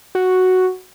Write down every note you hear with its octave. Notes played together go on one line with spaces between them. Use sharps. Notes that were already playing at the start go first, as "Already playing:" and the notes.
F#4